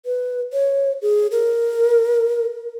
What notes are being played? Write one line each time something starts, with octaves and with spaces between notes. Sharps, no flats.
B4
C#5
G#4
A#4